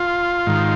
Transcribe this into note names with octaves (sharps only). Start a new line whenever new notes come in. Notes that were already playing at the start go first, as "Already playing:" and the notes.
Already playing: F4
G#2 D#3